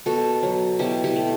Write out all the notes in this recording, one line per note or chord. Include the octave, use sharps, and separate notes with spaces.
B2 F#4 A4
F#3
B2 E4 G4
E4 G4
A3